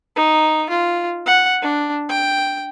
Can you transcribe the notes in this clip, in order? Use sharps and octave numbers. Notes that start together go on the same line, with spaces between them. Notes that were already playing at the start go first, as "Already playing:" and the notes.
D#4
F4
F#5
D4
G5